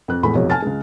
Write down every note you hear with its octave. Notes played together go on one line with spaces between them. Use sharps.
F2 F#6
E2 A2 G#3 B5
F1 B1 F3 G4 C#5
G#5 A5 F6 A6
C#2 G#3